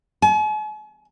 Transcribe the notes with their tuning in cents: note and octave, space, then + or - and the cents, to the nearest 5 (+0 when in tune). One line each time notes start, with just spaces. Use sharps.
G#5 +45